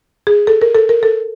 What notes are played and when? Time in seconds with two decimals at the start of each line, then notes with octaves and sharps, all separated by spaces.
0.27 G#4
0.47 A4
0.62 A#4
0.75 A4
0.89 A#4
1.03 A4